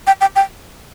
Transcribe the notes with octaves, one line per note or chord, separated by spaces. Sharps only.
G5
G5
G5